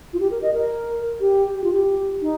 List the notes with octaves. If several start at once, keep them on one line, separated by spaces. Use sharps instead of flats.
F4
G4
A#4
D#5
A#4
G4
G4
F4
G4
D#4